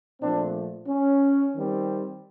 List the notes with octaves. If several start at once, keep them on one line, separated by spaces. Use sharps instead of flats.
A#2 F3 A3 C4 D4
C#4
D#3 G3 C4